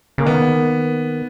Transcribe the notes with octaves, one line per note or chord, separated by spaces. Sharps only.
C#3 A#3
D#3 B3